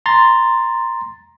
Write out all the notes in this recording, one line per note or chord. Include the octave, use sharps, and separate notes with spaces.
A#5 C6 A6